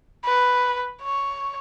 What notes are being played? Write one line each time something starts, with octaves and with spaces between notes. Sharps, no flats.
B4
C#5